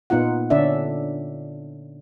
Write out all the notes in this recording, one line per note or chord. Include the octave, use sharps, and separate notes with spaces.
A#2 B3 D#4 F4 F#5
D3 C#4 D4 D5 E5